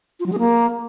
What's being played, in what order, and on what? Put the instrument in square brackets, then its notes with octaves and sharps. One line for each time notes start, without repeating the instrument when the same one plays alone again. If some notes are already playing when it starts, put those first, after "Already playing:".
[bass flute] F4
F#3
G#4
A#3